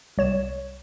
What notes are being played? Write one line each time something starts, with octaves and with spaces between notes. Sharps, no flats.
C2 C#5 E7